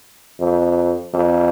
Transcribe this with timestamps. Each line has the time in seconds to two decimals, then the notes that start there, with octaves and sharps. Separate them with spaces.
0.40 F2
1.13 F2